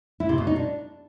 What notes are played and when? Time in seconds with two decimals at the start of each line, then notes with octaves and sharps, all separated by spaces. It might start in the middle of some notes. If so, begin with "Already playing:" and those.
0.20 E4
0.29 C3
0.38 B2
0.47 D#4
0.56 D4